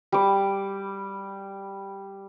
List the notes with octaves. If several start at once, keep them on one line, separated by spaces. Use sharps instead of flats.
G3 D6